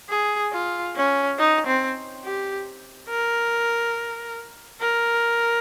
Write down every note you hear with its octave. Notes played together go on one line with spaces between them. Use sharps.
G#4
F4
C#4
D#4
C4
G4
A#4
A#4